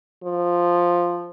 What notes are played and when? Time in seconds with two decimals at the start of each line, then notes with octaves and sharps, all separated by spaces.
0.24 F3